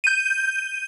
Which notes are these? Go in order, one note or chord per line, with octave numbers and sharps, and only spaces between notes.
G6 D#7